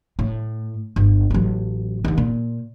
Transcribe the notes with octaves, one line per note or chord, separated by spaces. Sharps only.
A2
G1
A1 F#3
D#2 D#3
A#2